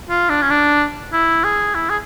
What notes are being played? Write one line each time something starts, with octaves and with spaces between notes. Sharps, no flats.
F4
D4
C#4
D4
E4
G#4
E4
G#4